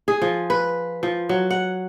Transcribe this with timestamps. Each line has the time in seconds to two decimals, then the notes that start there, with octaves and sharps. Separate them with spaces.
0.08 G#4
0.22 F3
0.50 B4
1.03 F3
1.29 F#3
1.50 F#5